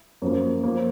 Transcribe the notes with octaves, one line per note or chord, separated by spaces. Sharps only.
F#2 F3 A#3
F3 A#3